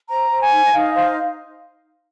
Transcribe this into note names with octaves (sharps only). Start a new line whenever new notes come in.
C5 A#5
C5
G#5
D#4
D#5
D#4 F5
C5 F5